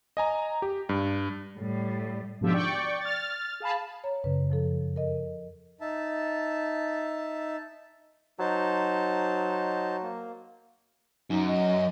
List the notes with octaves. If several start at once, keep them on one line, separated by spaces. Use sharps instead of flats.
D#5 G#5 A#5
G4
G2
A2 G3
G#2 B2 D3 F3 G4 E5
D5 G5 C#6
F6 A6
G#4 F5 A5 B5
C#5 A#5
F#2 C#3 B4
F2 F3 A4
A#4 D#5
D#4 E5 A5
F#3 D#4 C5 A5
A#3
F#2 D#4
D#5